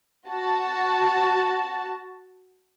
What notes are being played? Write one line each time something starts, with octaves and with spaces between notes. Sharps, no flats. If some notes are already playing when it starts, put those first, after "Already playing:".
F#4 A5